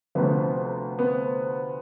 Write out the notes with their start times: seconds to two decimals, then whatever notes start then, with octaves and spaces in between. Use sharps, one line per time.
0.15 D2 C3 F3 B3
0.99 B3